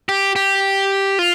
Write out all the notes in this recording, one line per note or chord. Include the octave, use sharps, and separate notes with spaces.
G4
G4
F4